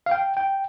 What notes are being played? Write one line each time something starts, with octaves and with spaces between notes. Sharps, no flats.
F5
G5
G5